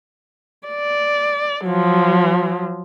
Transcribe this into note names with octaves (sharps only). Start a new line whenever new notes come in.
D5
F3 F#3